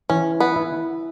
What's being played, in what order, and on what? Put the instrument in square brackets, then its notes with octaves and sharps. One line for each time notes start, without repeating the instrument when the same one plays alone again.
[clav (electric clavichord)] E3 [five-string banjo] C#4
[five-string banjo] B3
[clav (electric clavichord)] E4